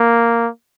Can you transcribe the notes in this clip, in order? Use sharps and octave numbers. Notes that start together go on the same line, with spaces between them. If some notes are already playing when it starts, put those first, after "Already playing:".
Already playing: A#3